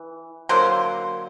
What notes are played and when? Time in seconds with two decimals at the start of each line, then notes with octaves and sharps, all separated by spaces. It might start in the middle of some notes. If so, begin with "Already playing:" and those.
Already playing: E3
0.49 D3 F#3 A#3 C5